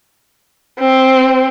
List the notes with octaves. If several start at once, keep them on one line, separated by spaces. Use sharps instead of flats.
C4